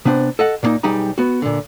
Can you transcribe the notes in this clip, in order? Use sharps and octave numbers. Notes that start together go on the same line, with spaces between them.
C3 B3 D4 C5
A4 D#5 F#5
A#2 D3 A#3 D#4
B1 G3 D#4 G4 G#4 A#5
B3 F#4
A#2 D3